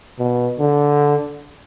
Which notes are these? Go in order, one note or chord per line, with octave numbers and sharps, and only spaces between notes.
B2
D3